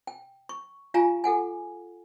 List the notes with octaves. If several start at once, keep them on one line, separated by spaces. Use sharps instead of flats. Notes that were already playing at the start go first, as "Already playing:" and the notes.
G5
C#6
F4 G4 F5 G#5 A#5
G#4 A4 F#5 G#5